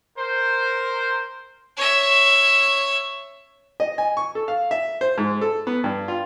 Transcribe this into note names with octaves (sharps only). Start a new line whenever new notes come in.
A#4 C5
C#5 E5
D#5
G#5
C#6
A4
F5
E5
C5
G#2
A4
B3
G2
F4